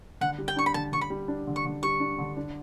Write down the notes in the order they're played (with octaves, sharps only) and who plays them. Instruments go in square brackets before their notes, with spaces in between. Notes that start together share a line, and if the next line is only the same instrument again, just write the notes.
[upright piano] D3 [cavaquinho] F#5
[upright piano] G3
[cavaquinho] G5
[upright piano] D4 [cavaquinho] C#6
[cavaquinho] B5
[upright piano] D3 [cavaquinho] A5
[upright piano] D3 [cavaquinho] C#6
[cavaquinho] B5
[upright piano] G3
D4
D3
[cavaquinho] C#6
[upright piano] D3
[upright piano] G3 [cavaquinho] C#6
[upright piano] D4
D3
D4